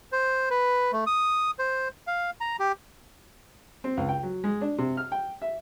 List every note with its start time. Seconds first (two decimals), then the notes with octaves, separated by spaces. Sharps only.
0.12 C5
0.50 B4
0.92 A3
1.06 D#6
1.59 C5
2.07 F5
2.41 A#5
2.59 G4
3.84 C4
3.97 C#2
4.09 G5
4.23 F#3
4.44 G#3
4.61 D4
4.78 C3
4.97 F6
5.12 G5
5.42 E5